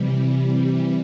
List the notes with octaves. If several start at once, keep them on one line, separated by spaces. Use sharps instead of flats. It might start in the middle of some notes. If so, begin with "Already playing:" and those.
Already playing: C3 E3 G3